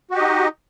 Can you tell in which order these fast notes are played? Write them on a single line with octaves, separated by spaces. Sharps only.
F#4 G4 D#5 D#4